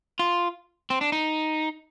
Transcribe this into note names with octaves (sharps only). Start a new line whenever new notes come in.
F4
C4
D4
D#4